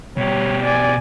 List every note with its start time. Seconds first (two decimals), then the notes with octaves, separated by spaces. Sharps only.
0.18 B2 G3 G4 C#5
0.64 D5 G#5